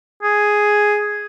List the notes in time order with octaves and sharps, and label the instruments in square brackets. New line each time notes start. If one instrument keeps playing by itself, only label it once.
[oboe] G#4